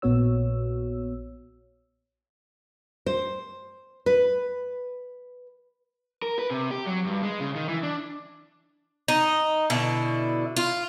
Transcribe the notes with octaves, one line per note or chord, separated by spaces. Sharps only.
A#1 A#2 B3 F#4 C#5 E6
C5
B4
A#4
B4
C3
G4
F#3
G2
G#3
C#3
D#3
E3
D4
D#4
B2 D3 E4
F4